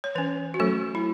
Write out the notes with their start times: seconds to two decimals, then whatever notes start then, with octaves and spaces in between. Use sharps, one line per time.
0.04 C#5
0.15 E3 C#4 B4
0.54 F#4
0.59 F#3 A3 C#4 A4
0.95 E4